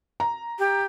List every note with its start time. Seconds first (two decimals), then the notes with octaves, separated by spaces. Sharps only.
0.20 A#5
0.59 G4